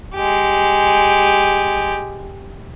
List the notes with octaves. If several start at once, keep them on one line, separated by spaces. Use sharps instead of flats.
G#3 G4